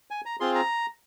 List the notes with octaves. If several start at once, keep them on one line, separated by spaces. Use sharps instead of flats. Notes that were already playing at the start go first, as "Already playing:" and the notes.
G#5
A#5
C4 F4 G#4 C6
A#5